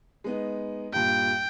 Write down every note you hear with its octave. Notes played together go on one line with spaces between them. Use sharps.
G#3 B3 D#4
G2 A#2 G5